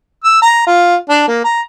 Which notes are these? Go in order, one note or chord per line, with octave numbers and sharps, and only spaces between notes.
E6
A#5
F4
D4
A#3
A#5